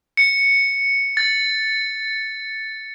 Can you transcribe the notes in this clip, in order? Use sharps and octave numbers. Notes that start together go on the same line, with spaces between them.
C#7
A6